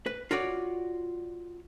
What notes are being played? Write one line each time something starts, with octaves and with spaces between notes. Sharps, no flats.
B4
F4 F#4 C#5 D5